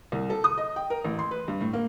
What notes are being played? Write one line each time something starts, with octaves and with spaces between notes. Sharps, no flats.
C2
A4
D#6
D#5
G5
A#4
A1
C6
B4
G2
A2
A#3